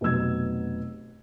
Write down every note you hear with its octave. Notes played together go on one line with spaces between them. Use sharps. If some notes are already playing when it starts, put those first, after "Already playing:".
F1 B2 F#3 E6 G#6